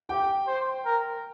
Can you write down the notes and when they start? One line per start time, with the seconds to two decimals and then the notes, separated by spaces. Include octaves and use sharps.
0.09 G4 G5
0.47 C5
0.85 A#4